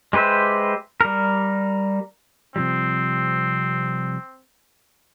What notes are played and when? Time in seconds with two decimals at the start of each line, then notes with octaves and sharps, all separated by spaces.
0.13 G#3 G4 B4 C5 E5
1.01 G3 A#4
2.56 C3 F3 G3 C4